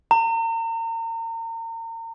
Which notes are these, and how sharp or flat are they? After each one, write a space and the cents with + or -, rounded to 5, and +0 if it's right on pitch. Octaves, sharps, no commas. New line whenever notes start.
A#5 -35